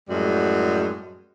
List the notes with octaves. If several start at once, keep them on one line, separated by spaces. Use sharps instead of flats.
F#2 A2 G3 G#3 F#4